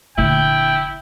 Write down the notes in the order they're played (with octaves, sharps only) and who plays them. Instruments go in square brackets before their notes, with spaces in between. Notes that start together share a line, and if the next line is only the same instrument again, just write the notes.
[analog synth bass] F1 [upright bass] A#2 D3 [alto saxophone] E4 [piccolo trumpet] G5